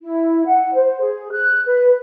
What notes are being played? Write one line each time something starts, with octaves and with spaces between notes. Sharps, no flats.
E4
F#5
C5
G#4
F#6
B4